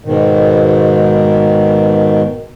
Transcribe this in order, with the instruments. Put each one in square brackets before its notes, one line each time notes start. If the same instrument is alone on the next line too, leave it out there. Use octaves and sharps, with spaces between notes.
[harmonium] G#2 B2 D#3